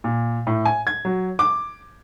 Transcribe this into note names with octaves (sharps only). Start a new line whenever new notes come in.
A#2
A2
G#5
G#6
F#3
D6